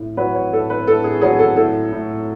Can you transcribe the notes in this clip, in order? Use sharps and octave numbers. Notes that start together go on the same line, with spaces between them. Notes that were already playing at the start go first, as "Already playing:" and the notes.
Already playing: A2
F#3 B4
C#5
A2 A4
B4
A2 A4
G#4
F#3 G#4
A4
A2 A4
A2